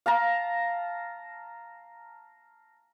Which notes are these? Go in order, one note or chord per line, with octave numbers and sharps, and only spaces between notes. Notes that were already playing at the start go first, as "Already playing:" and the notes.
F5 A5 A#5